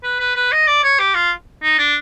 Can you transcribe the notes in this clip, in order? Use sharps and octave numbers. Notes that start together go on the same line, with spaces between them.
B4
B4
B4
D#5
D5
C#5
G4
F4
D#4
D4